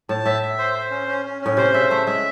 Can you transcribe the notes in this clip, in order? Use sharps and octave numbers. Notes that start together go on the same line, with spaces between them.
A2 A5
A2 E5
E5
C5
C5
C#4
C#4
C#4
A2 C#4
C3 C5
C#3 E5
A3 E5
G#3 E5